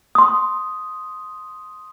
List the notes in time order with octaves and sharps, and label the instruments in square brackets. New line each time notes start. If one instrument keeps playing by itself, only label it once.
[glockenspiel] C6 D#6